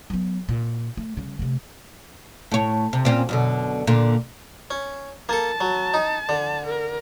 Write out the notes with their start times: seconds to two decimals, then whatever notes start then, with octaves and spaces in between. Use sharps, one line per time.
0.10 F#3 B3
0.49 A#2
0.97 A3
1.17 C#3 G3
1.39 C3 A3
2.52 A2 C#5
2.93 C3
3.05 A#2 C4 C#4
3.29 F#2 B2 D3
3.87 A#2 D3
4.71 C#4
5.29 A#3 A4 A5
5.61 F#3
5.94 D#4
6.29 D3
6.67 A#4